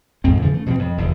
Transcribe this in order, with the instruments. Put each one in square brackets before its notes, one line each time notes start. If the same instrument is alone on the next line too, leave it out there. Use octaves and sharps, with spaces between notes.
[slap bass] F2 G#2 B2 C4
G2 C#3 E3 F3
A3
B2 F3 A#3 C4
F2
F1 E2 D3